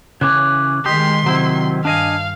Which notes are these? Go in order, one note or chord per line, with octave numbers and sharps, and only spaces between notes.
C#3 E3 C#4 D6 F#6
D#3 G#3 G4 C6 D#6 B6
C3 D#3 F#3 C4 E4
G2 D4 D#5 F5 G#5